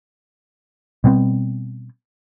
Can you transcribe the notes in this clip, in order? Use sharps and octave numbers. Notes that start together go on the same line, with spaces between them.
B2 G3 B3 C4